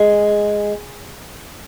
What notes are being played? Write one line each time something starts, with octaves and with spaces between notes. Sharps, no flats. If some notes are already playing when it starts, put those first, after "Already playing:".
Already playing: G#3